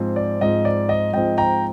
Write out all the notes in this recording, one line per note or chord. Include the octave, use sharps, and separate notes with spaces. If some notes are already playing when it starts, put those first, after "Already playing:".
Already playing: G#2 F3 C4
D5
G#2 F3 C4 D#5
D5
D#5
G#2 F3 C4 D#5 G5
G5 A#5